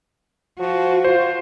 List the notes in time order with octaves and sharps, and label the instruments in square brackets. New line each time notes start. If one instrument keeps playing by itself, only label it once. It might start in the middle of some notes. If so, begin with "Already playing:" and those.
[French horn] F3 [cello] F#4
[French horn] F4 [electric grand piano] C5